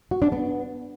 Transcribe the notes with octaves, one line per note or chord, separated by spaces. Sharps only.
F#4
D4
B3